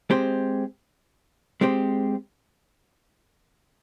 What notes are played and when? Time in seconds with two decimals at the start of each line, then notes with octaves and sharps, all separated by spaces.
0.10 G#3 C4 G4 C5
1.61 G#3 C4 G4 C5